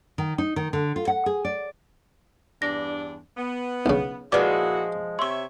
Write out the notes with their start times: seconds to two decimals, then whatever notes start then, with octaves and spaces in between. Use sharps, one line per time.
0.18 D#3
0.38 D#4
0.56 D#3
0.73 D3
0.96 F4
1.08 F#5
1.26 G#4
1.45 D5
2.62 E2 G2 D4 A#6
3.37 B3
3.86 B1 C#3
4.32 A#2 F3 G#3 E4 F#4 B4 D5 D6
5.19 C3 C#5 E5 C6 C#6